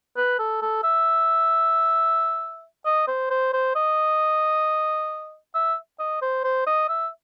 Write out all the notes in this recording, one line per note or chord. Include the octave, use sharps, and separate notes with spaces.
B4
A4
A4
E5
D#5
C5
C5
C5
D#5
E5
D#5
C5
C5
D#5
E5